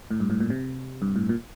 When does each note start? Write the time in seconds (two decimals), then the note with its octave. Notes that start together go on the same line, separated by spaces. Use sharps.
0.11 A2
0.20 G2
0.30 A2
0.40 A#2
0.50 C3
1.02 G2
1.16 A2
1.29 A#2